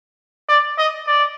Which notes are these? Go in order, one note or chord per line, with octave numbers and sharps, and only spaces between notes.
D5
D#5
D5